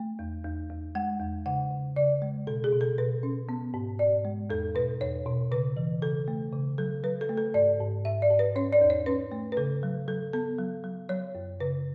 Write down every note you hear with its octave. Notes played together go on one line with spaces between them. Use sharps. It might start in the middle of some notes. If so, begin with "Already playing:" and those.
Already playing: A3
E2
E2
E2
G#3 F#5
E2
C#3 F#5
C#3
C#3 D5
G#3
B2 A4
G#4
B2
A4
B2 B4
C#4
B3
G#2
G#2 D5
G#3
E2 A4
B2 B4
E2 C#5
B2
C#3 B4
E3
C#3 A4
A3
C#3
F#3 A4
F#3 B4
A4
A3
A4
G#2 D5
G#2
G#2 E5
D5
G#2
B4
C#4 C#5
D5
E2
C#5
C#4 B4
A3
B4
C#3 A4
F#3
F#3 A4
B3 A4
F#3
F#3
F#3 C#5
F#2
C#3 B4